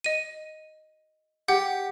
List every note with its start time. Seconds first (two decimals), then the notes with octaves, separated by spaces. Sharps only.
0.04 D#5 D#7
1.48 G4 F#5